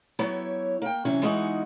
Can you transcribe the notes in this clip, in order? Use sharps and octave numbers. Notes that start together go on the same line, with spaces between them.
F#3 B3 E4 G4 C#5
A#3 G5
C3 E3 F#3 C#4
E3 G#3 B3 D#4 F#4